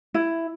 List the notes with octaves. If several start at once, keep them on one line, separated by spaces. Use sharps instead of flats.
E4